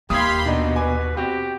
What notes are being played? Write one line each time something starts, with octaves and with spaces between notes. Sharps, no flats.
D#2 G4 F5 B5 C6 D#6 G#6
B2 D4 D#4
B4 G#5 D6
C4 F#4 G4